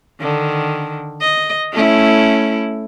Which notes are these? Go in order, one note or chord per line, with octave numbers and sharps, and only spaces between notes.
D3 D#3
D#5
A3 C#4 E4